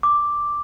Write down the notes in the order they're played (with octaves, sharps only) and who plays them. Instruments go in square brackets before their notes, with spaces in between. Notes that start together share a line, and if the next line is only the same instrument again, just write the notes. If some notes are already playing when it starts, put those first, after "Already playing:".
[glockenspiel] D6